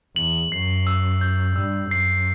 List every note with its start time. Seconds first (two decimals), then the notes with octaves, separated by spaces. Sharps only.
0.16 E2 F#7
0.52 F#2 C7
0.87 E6
1.21 G6
1.56 G2 E6
1.91 F#2 C7